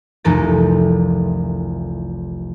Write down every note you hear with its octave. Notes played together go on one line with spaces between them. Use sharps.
F1 C2 E3 A4 A#4 A6